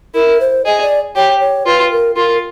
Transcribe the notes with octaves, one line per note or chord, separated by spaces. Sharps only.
E4 A#4
C5
G#4 D#5
D5
G4 C#5
C#5
F4 B4
A#4
F4 A#4